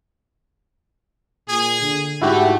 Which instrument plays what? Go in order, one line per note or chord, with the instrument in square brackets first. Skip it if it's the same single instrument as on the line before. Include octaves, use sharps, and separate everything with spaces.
[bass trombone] A#2 [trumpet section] G#4
[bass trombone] D3
[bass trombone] G#2 [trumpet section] A3 [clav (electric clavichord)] E4 F#4 G4